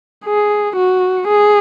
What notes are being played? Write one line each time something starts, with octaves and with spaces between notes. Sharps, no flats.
G#4
F#4
G#4